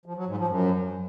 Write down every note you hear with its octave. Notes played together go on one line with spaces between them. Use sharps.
F3
F#3
G#2
F3
F#2